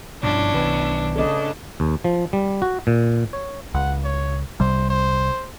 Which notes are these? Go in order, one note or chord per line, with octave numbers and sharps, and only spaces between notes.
G2 B2 F3 C#4 D4 E4
B1 D#3 B3 B4
C#3 D4 A4 D5 D#5
D#2
F3
G3
F#4
A#2
C#5
C#2 F#5
C#5
C2 C3 G3 C5
C5